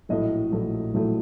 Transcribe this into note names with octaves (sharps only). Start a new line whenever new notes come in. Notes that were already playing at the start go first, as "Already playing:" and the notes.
A#1 A2 F#3 A3 D#5
A#1 A2 F#3 A3
A#1 A2 F#3 A3